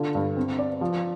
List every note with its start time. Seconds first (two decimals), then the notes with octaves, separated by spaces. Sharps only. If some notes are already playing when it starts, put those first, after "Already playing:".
Already playing: D3 F4
0.15 G2
0.37 C4
0.59 D5
0.81 F3